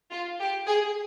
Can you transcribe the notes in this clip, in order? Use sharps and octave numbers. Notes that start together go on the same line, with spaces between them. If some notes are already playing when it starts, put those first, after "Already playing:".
F4
G4
G#4